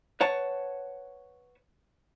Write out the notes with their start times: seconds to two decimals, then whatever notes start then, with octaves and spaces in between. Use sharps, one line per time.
0.21 B4 C#5 F#5 A5